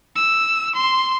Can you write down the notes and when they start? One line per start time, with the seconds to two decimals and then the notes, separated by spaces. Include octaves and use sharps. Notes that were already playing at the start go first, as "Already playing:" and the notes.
0.15 E6
0.75 C6